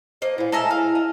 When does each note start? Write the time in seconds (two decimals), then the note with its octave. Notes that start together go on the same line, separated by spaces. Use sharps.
0.22 A#3 C5 D#5
0.38 A#2 B3 E4
0.52 G#3 A4 A#4 D#5 E5 G#5
0.71 F5
0.95 D#5